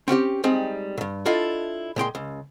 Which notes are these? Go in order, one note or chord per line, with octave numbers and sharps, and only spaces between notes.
C4 C#4 F#4 G4
G3 G#3 C4 D#4
G2 A#2
D4 E4 F4 A4 D5 D#5
A#2 G#3 G5 C6
C#2